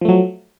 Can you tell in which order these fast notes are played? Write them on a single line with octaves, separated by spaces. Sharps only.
F3 A3 F#3